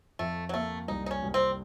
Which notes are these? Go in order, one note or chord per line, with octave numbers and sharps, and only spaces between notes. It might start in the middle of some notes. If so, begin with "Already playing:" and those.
F2 A3
F#3
A3 A#3
C2 D#4
D#4
C#4
C2
C4